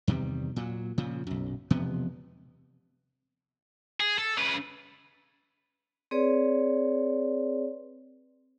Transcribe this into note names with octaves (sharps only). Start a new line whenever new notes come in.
E2 C3 D#3 G3
A#2 F#3
A#2 C#3 F3
B1 F#2
E1 C3 F3 B3
G#4
A4
C#3 B4
C4 G#4 B4 C#5 D5